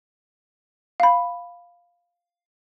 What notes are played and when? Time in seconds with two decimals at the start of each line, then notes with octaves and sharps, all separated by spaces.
1.00 F5 B5